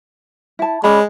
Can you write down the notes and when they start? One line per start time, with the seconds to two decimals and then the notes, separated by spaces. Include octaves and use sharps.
0.59 E4 A5
0.84 G#3 C#4 D5 B5